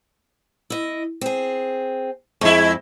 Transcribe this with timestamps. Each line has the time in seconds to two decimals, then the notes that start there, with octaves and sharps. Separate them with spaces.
0.70 E4 D#5
1.21 C4 G#4
2.41 F2 G#3 E4